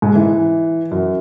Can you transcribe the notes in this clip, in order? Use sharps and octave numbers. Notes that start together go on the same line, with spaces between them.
G#2
E3
F#2